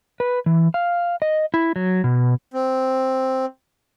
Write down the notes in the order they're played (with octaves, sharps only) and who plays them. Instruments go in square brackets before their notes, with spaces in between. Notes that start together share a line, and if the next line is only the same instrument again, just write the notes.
[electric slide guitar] B4
E3
F5
D#5
E4
F#3
B2
[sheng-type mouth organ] C4